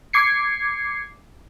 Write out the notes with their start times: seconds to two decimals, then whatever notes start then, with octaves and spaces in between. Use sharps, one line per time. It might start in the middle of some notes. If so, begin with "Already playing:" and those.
0.13 D6 G#6 C7 C#7